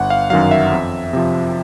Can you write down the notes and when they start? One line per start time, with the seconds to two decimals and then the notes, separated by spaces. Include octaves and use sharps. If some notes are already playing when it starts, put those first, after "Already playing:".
Already playing: G1 F#5
0.10 F5
0.30 F#2 D#3 F#3 F5
0.51 E5
0.72 F2
1.13 C3 F3